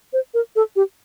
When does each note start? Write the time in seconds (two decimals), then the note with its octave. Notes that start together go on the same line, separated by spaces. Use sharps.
0.13 C5
0.34 A#4
0.56 A4
0.76 G4